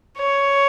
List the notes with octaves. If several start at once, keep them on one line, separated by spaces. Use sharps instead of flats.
C#5